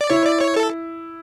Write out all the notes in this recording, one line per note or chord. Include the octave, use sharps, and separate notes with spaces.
D5
E4 C#5
D5
C#5
A4